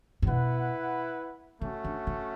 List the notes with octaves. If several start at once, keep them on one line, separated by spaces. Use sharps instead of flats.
A2
B2 E4 B4 F#5
C#3 A3 C#4 F#4
D3
C#3